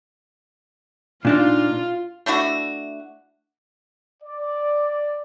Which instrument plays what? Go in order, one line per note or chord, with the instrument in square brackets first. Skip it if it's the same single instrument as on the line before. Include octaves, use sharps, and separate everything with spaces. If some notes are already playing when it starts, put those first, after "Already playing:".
[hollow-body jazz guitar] A#2 D4 D#4 [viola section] F4
[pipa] A3 D4 E4 F#4
[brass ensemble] D5